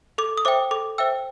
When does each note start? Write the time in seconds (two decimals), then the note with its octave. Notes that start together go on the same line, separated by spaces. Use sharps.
0.18 A4 D6
0.37 D#6
0.45 C5 E5 G5 D6
0.71 A4 D6
0.98 C5 E5 G5 E6